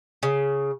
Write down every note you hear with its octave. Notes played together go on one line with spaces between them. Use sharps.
C#3